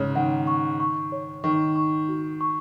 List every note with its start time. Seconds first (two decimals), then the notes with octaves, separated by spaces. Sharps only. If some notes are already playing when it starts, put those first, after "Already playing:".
Already playing: G#2 C#3 C#5
0.15 D#3 F#5
0.47 C#6
0.80 C#6
1.12 C#5
1.44 D#3 C#6
1.76 C#6
2.09 F#4
2.41 C#6